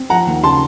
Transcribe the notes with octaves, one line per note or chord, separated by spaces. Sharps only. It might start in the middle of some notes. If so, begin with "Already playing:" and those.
Already playing: C4
F3 F#5 A#5
D#2
C#3 A5 C6